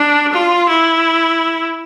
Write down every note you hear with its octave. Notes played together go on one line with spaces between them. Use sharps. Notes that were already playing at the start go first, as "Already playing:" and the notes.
Already playing: D4
F4
E4